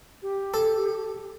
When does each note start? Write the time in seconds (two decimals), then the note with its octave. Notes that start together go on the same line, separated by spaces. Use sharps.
0.22 G4
0.54 A4